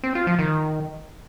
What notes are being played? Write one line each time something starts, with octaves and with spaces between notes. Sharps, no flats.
C4
F4
F3
D#3